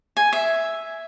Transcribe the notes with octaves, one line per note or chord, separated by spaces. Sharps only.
G#5
E5